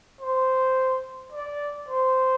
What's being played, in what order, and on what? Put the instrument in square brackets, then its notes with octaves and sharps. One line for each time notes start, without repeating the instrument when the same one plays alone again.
[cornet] C5
D5
C5